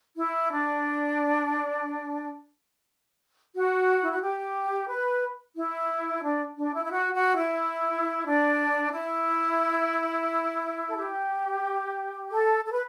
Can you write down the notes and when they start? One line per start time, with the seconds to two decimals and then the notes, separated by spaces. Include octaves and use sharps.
0.17 E4
0.51 D4
3.54 F#4
4.02 E4
4.12 F#4
4.22 G4
4.89 B4
5.56 E4
6.23 D4
6.57 D4
6.74 E4
6.85 E4
6.91 F#4
7.14 F#4
7.36 E4
8.26 D4
8.93 E4
10.89 A4
10.96 G4
12.31 A4
12.65 A4
12.72 B4